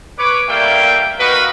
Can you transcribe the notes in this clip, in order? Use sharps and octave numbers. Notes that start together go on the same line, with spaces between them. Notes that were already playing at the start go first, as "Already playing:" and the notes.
B4 C#5 D6
G3 A3 A#3 E4 F5 G5
A#3 D#4 F#4 A#4 B4